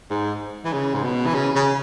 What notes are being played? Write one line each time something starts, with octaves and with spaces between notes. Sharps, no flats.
G#2
E3
C#3
G#2
B2
E3
C#3
C#3